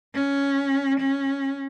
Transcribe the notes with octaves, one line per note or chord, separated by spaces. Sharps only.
C#4
C#4